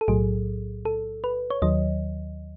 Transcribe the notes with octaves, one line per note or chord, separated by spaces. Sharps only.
A4
B1 A2 F#3 G#4
A4
B4
C#5
D#2 D#3 F#3 D#5